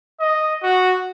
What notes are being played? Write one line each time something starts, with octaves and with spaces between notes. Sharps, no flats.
D#5
F#4